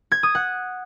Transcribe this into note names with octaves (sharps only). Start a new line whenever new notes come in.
G#6
D#6
F#5